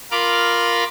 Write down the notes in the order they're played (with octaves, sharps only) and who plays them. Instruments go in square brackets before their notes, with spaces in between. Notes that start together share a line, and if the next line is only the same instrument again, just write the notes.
[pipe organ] F4 A#4 B5 D6 F6